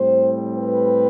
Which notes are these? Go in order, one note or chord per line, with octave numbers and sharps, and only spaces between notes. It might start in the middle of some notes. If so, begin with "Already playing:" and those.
Already playing: A2 G3 C4 C5
B4